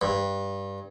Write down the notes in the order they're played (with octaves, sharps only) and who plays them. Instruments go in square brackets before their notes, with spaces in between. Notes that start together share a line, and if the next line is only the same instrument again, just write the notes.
[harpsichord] G2